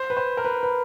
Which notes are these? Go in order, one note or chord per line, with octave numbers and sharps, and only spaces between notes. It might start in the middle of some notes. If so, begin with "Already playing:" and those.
Already playing: C5
B4
C5
A#4
B4
B4